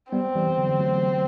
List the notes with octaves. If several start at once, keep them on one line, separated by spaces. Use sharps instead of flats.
G3 B3 C4
E3 G3
D3 F#3
F#3 A3